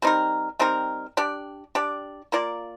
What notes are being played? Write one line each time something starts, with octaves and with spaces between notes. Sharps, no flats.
G3 C4 D#4 A#4
G3 C4 D#4 A#4
D4 G4 D5
D4 G4 D5
A#3 F4 A#4 D5